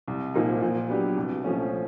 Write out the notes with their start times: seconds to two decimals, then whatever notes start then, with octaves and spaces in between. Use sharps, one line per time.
0.08 C2
0.34 A#2 F3 A#3 D#4
0.62 A#2
0.89 F#3 B3 D4 G4
1.17 C2
1.44 A#2 F3 A3 C#4